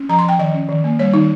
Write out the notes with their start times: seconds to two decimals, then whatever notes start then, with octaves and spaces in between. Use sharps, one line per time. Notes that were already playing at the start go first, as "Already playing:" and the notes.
Already playing: C#4
0.09 F3 A#5
0.19 C6
0.25 F3 G5
0.39 D#3 D#5
0.54 C#4
0.69 D#3
0.84 A#3
0.99 G3 C#5
1.14 D#3 D#4